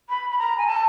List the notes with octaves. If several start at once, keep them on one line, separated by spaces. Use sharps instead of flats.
B5
B5
A#5
G#5
A5